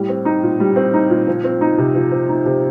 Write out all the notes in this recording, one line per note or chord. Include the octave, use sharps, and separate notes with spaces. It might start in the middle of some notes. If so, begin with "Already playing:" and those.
Already playing: A2 G3
C4
D#4
A#2
G3
C4
D#4
A#2
F3
C4
D#4
C3
F3
C4
D#4
C3